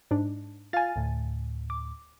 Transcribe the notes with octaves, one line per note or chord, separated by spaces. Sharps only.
G#2 D4
F4 F5 G#5 A6
D2 A2
D6